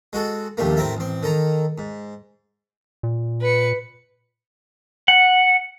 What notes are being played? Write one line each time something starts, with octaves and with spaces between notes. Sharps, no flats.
G#3 F#4 A4
A#1 D#2 G3 A3 A#3
A2 C4 A#4 E5
A1 C4
D#3 A4 A#5
G#2
A#2
B4 C#7
F#5